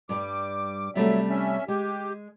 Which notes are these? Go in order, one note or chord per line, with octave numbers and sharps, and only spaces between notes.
G2 G3 D6
C3 F#3 G3 A3 E5
C#4 E5
G#3 G4